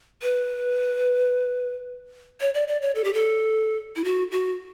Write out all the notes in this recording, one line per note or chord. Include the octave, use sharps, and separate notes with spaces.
B4
C#5
D5
D5
C#5
A4
G4
A4
E4
F#4
F#4